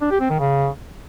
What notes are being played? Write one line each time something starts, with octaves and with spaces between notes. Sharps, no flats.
D4
G4
C4
D#3
C#3